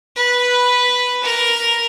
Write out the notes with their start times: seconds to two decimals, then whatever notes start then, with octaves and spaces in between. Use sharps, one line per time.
0.16 B4
1.23 A#4